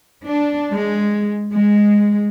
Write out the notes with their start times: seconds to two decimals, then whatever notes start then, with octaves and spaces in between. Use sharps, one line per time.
0.25 D4
0.72 G#3
1.53 G#3